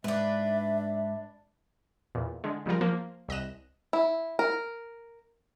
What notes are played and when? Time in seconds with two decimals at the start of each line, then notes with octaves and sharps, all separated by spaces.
0.04 G#2 D4 B4 E5
2.15 E2 A#2
2.44 D3 G#3
2.66 C#3 F3 G3 F4 A#4
2.81 F3 A#3
3.28 C2 D#5 F#6 E7
3.93 E4
4.39 A#4